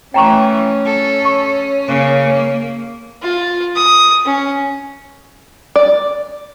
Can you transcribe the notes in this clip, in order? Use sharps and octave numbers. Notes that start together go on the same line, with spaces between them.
E3 A3 C#4 G5 A#5 C#6
A4
C#6
C#3 A#3
A#3
F4
D#6
C#4
D5